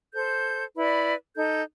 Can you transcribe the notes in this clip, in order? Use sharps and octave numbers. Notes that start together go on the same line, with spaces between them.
A4 C5 G6
E4 B4 D5 B5
D#4 A4 G6